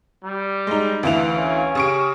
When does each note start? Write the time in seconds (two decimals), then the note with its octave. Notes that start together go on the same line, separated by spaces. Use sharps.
0.24 G3
0.67 G#3 D#4
1.03 D2 E3 F5 F7
1.36 C#4
1.75 C#3 G4 C#6 D7